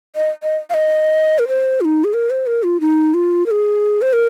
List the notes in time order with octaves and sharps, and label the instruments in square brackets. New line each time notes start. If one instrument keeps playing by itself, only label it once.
[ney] D#5
D#5
F5
D#5
A#4
C5
F4
D#4
G#4
A#4
C5
A#4
F4
D#4
F4
A#4
G#4
C5
A#4